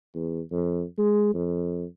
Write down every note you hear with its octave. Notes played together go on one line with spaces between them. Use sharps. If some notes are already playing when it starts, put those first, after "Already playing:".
E2
F2
G#3
F2